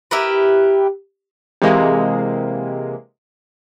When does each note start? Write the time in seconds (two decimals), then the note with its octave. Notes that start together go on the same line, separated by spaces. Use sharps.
0.11 E4 G4 A#4 B4
1.62 C3 E3 G#3 A#3